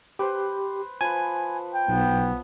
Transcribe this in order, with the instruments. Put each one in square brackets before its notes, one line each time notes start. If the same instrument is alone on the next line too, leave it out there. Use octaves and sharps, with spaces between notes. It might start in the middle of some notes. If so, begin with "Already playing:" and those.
[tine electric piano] G4 [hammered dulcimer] B4 C5
[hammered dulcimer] F3 B4 [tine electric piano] G#5
[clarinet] G5
[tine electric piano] B1 [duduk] B3